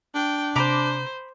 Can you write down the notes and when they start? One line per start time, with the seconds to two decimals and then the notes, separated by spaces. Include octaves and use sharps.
0.15 D4 G5
0.56 C3 C5 A#5 B5 D6